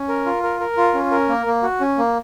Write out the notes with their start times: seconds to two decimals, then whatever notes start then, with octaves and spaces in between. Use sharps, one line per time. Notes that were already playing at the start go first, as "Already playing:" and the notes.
Already playing: C#4
0.09 A#4
0.26 F4
0.43 A#4
0.60 A#4
0.77 F4
0.94 C#4
1.11 A#4
1.29 A#3
1.46 A#3
1.63 F#4
1.81 C#4
1.98 A#3